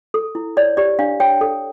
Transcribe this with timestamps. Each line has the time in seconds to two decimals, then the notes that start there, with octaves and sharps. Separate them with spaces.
0.14 A4
0.35 E4
0.57 C#5 D5
0.77 G4 D5
0.99 D4 F5
1.20 C#5 G5
1.41 A4